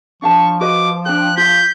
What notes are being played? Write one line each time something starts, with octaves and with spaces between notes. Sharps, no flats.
F3 D4 F5 A5 C#6
F#4 B4 D#5 D6
D4 C5 G5 F#6
F4 F5 G6 B6